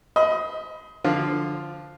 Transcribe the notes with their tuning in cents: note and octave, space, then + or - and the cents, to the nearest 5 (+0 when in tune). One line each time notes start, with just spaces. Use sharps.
C5 -15 D#5 +25 B5 +0
D3 +5 F3 +0 F4 +0